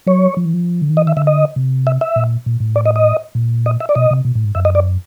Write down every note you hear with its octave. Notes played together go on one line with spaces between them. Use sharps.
F#3 C#5
F3
E3
F3
D3
D#3
E3 D#5
D#3 E5
D3 E5
D#5
C3
E5
E5
A#2
A#2
A2
D5
D#5
D#5
A#2
D#5
E5
D5
B2 D#5
C3
B2
A2
G#2
F#2 E5
D#5
D5